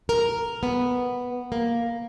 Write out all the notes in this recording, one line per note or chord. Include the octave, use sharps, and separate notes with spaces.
A#4
B3
A#3